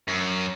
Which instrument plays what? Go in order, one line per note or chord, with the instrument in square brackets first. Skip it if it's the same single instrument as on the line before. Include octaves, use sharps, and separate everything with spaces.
[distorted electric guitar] F#2